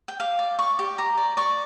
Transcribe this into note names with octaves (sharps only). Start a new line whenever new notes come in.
G5
G4 F5
D5
D5 C#6
G4
G4 A#5
D5
D5 C#6